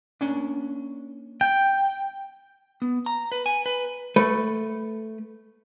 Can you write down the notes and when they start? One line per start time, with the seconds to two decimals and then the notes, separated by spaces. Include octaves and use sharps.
0.21 A#3 C#4 D4
1.41 G5
2.82 B3
3.06 A#5
3.32 B4
3.46 G#5
3.66 B4
4.16 A3 B4